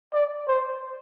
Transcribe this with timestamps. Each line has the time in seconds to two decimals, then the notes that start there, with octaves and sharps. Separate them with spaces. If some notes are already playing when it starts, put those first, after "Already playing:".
0.13 D5
0.48 C5